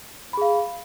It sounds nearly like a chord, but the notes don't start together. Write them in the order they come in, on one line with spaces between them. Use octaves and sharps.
B5 G#4 F5